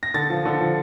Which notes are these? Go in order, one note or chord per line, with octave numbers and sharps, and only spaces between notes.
A#6
D3 A6
F3
D3
F3